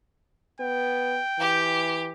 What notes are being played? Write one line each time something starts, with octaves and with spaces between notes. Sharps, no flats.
B3 G5
E3 G4